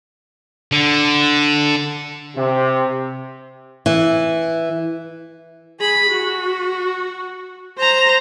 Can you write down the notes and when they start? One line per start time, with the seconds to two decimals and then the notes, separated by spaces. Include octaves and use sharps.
0.72 D3
2.36 C3
3.86 E3
5.80 G#4 B5
6.09 F#4
7.78 C5 A#5